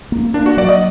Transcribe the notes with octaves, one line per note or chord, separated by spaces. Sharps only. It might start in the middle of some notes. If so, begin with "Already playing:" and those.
A#3
A#3 D4
F#4
F#3 D5
D#5